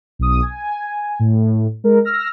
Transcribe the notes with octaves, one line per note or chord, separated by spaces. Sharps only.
B1 D#6
G#5
A2
G#3 A#4
E6 F6 A#6